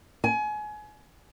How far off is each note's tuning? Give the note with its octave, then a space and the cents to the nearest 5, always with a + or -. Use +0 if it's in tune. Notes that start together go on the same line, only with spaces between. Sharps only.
G#5 +30